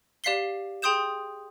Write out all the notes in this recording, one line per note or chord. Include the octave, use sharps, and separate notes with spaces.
G4 D5 F5 B6 C7 G7
G#4 G5 C6 D#6 G6 E7